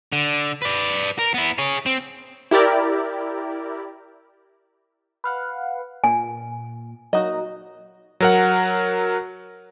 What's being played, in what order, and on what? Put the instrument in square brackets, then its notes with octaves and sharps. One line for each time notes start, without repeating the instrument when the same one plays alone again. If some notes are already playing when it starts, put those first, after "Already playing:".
[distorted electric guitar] D3
B4 D5
A#4
B3 E4
G#4 C#5
C4
[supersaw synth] E4 G4 A#4 D5
[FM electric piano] B4 F5 F#5
[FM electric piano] A#2 [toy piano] G#5
[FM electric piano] F#3 A#3 D#4 [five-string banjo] F#4 D#5
[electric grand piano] F#3 A#4 F#5